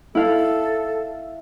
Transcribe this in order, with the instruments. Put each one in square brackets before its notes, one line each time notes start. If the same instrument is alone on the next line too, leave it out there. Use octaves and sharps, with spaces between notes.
[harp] E4 F5 [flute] A4